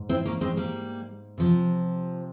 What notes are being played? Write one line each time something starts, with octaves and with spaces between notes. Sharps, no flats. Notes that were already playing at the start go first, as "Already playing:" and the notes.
Already playing: G#2
C4 E4
A#3 C#4
G#3 C4
G3 A#3
C3 F3